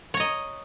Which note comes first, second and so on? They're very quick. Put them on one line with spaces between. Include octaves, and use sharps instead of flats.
C#5 A#5 D#5